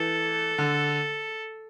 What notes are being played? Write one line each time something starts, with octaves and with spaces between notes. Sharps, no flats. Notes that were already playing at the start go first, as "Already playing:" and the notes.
Already playing: E3 A4
D3